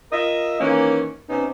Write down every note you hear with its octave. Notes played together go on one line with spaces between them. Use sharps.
F4 A#4 D#5 E5
D#3 E3 A#3 C#4
C3 B3 C#4 D#4